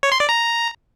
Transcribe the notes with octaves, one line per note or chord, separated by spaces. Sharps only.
C#5
C6
D5
A#5